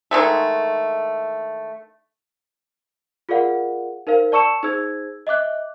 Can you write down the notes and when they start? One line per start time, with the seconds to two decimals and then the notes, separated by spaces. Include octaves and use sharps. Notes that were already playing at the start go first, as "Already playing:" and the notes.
0.11 D3 D#3 G#3 A3
3.29 F4 G#4 A#4 D5 F5 F#5
4.07 D#4 A#4 C5 F5
4.32 D5 A5 C#6 E6 C#7 E7
4.63 D#4 G#4 C5 E6 G#6
5.27 D#5 E5 D6 F#6